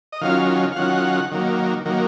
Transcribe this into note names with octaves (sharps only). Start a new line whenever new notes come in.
D#5
D#3 F#3 C#4 F4 F5
F5
D#3 F#3 C#4 F4 F#5
D#3 F#3 A#3
D#3 F#3 A#3